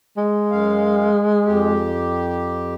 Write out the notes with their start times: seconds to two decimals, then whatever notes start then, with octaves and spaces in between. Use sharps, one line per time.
0.17 G#3
0.51 F#2 F5
1.45 F2 G4